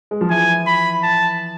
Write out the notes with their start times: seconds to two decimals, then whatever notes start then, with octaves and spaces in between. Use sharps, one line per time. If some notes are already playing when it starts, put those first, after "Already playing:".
0.11 G#3
0.21 F3
0.30 E3 G#5
0.67 B5
1.03 A5